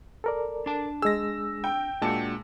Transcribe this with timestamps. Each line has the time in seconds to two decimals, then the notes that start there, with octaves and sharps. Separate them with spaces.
0.24 A4 A#4 D5
0.66 D4 A5
1.02 G#3 G#4 E6 A#6
1.64 G5
2.02 A#2 G#3 D4 F#4 A5